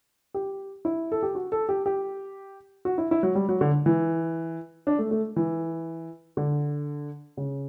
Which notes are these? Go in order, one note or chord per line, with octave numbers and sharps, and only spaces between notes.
G4
E4
A4
G4
F#4
A4
G4
G4
F#4
E4
E4
F#3
G3
F#3
D3
E3
D4
A3
A3
E3
D3
C#3